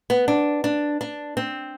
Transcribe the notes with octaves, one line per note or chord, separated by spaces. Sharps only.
B3
D4
D4
D4
C4